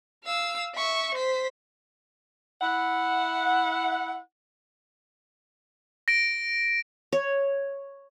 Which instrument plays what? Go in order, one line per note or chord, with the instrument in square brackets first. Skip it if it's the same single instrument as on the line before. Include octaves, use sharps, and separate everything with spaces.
[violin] F5 E6
E5 C#6
C5 B6
[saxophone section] E4 F#5
[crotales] A#6 D7
[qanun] C#5